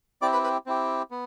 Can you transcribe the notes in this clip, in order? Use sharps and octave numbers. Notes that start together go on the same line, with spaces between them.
C4 E4 G4 D5 D6
B4 B5
B4 B5
C4 E4 G4
B3